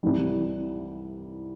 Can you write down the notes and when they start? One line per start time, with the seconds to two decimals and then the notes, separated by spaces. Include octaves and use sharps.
0.03 C2 C3 E3 G3